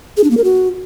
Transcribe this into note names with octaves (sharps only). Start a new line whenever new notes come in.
G#4
D4
A#3
A#4
F#4